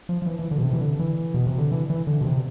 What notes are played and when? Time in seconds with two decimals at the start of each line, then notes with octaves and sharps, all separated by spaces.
0.09 F3
0.22 F3
0.26 E3
0.39 E3
0.51 D3
0.58 B2
0.63 C3
0.73 E3
0.81 D3
0.99 E3
1.34 B2
1.47 C3
1.58 D3
1.72 E3
1.90 E3
2.07 D3
2.21 B2
2.25 C3